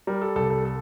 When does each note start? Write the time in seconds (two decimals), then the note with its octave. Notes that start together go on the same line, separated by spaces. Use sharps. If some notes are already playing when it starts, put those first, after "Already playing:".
0.07 G3 A#4
0.22 A4
0.36 C2 A4
0.50 A4
0.65 A4